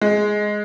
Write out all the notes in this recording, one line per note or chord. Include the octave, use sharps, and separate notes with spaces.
G#3